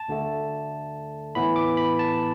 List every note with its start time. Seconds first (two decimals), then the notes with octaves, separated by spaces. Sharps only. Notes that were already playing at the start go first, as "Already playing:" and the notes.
Already playing: A5
0.08 D2 D3 A3
1.35 A2 E3 B3 B5
1.56 D6
1.77 B5
1.99 A5